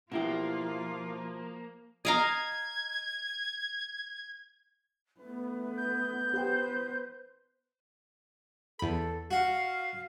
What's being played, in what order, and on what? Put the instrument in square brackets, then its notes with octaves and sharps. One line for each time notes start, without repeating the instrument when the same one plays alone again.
[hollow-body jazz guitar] B2 E4 G4 [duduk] F3 [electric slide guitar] A#3 [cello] F4
[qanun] D#5 F5 A#5 [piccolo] G#6
[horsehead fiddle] A3 B4 [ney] B3
[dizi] G6
[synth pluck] G4 F#5 G5 [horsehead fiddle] B4 C5
[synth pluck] E2 B5 [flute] A4
[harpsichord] F#4 [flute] F5